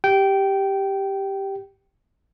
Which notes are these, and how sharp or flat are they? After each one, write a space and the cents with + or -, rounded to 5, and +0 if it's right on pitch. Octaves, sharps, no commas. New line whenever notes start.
G4 +0 G5 -15